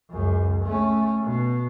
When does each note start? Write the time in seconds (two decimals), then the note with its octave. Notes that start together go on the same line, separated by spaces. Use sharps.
0.11 C#2 F#2
0.64 A3 C#4
1.23 B2